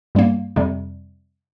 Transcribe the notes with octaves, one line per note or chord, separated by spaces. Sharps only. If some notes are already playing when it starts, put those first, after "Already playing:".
G2 G3 A#3
F2 C3 G3